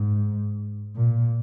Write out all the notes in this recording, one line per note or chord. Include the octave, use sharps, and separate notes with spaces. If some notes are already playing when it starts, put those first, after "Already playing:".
Already playing: G#2
A#2